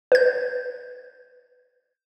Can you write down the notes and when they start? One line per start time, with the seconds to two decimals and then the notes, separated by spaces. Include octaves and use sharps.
0.12 B4 G6